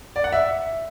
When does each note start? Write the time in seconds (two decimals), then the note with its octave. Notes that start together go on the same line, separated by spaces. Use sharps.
0.16 D5
0.24 F#5
0.32 E5